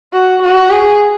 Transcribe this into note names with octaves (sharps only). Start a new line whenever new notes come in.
F#4
F#4
G#4